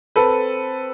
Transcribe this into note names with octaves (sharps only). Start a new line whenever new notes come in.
C4 A4 B4